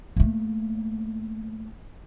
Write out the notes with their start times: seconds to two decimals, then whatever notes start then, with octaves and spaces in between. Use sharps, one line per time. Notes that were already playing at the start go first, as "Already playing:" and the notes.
0.16 A3 A#3